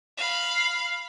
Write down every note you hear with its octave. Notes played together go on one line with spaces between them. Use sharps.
F5 B5